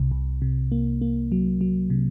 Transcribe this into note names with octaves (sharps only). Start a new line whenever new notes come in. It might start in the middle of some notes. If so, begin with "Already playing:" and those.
Already playing: C2 C3
C2
C3
A#3
A#3
F#3
F#3
C3